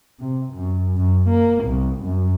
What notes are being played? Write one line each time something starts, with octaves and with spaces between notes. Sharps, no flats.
C3
F#2
F#2
A#3
C2
F#2